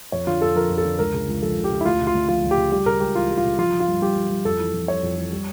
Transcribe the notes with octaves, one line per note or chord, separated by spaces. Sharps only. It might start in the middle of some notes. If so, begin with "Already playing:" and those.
F2 C#5
D3 F4
F2 A4
F3 A#4
F2
A4
D3
C#2 A#4
C#3
C#2
F3 A4
C#2
G4
C#3
E4
D2 F4
C#3
F4
D2
F3 F4
D2
G4
C#3
G3 G4
C#3 A#4
C#2 G4
E3 F4
G3
F4
C#3
F3 F4
F3
F4
G2
G2 G4
F3
F3
F2 A4
E3
F2
G3 C#5
F2
E3
G3